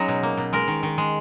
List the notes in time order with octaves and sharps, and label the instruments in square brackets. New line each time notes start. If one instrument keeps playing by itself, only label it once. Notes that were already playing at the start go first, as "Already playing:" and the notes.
Already playing: [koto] F#3 G#3 C#4 D#4
B2
A#3
B2
G#3 A#4
D#3
D#3
G#3